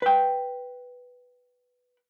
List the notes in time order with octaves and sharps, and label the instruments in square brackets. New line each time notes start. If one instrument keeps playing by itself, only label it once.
[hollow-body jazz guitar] B4 G5